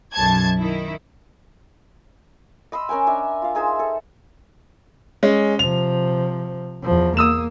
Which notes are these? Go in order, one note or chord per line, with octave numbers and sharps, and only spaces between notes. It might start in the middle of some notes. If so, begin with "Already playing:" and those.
B1 F#2 A5 G#6
D#3 E4
D#5 B5 C6 E6
C#4 A#4 G5 G#5
D4 E5 G#5
F4 F5
D#4 G#4 C5 E5
A4
G#3 C#4
C3 F3 F7
E2 F3
A#3 D#6 E6 E7